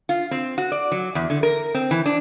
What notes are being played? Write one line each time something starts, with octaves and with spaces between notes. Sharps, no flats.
F4
C4
F#4
D5
F#3
E2
D3
A#4
C4
E3
D4